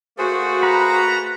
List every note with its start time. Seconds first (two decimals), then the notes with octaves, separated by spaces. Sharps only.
0.18 A3 A#3 F#4 G#4 C5
0.63 B4 A#5